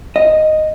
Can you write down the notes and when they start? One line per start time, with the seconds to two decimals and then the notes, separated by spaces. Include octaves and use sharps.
0.16 D#5